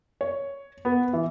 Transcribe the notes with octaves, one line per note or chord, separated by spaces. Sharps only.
C#5
B3
E3